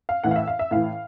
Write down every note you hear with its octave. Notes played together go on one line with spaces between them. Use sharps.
F5
A2 E3 F#5
F5
E5
F5
E5
A2 E3 F5